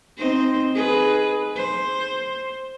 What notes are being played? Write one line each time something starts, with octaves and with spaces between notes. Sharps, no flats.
C4 D#4 C5
D#4 G#4 B4
C5